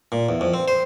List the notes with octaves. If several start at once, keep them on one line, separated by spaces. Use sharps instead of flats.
A#2
E2
F2
C4
C5